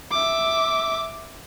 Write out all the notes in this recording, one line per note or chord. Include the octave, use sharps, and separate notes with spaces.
E5 D6